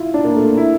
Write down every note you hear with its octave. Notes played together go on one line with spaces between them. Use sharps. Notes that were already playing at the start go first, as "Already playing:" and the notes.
Already playing: E4 F4
D4
A#3
A3
A#3
E4